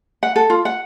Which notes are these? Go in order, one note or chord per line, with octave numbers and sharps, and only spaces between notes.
F#5
A4
F4
F#5